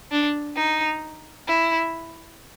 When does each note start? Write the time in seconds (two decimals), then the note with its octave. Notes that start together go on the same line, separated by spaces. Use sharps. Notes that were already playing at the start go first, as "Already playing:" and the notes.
0.11 D4
0.56 D#4
1.47 E4